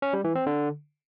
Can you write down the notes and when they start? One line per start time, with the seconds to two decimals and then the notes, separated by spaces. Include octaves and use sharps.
0.02 C#4
0.13 G3
0.24 E3
0.35 C4
0.46 D3